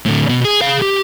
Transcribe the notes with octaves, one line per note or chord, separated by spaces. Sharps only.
A2 D3
B2
G#4
G#4 F5
G4